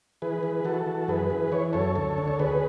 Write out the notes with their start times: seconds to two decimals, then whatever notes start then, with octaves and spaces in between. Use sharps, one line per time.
0.22 E3 G#4 B4
0.43 E3
0.65 E3 F#4 A4
0.86 E3
1.08 F#2 G#4 B4
1.30 E3
1.52 E3 C#5
1.73 F#2 A4 C#5
1.95 D2 A4 C#5
2.18 D3
2.28 A4
2.39 D2 G#4 B4